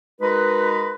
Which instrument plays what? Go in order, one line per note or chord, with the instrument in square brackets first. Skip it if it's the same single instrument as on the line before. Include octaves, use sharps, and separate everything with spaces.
[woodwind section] G#3 D#4 F#4 A#4 B4